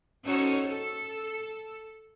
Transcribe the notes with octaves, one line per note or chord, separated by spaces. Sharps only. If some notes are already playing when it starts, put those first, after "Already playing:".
C#4 D#4 F#4 A4 C5 C#5
A4